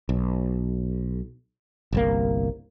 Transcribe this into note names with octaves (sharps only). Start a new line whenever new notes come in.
B1
G1 C2 A#3